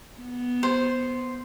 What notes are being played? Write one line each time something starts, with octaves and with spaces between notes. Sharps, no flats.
B3
C5